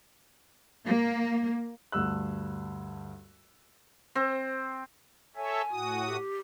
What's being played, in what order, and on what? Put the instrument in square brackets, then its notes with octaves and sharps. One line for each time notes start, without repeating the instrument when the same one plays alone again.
[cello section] A#3
[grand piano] D2 G2 E6 F#6
[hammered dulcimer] C4
[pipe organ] A4 C#5 E5 [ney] G#5
[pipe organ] A2 F#4 D#6
[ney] G4